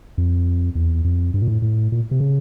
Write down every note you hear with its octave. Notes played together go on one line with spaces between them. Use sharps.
F2
E2
F2
G2
A#2
A2
A2
A#2
C3
C#3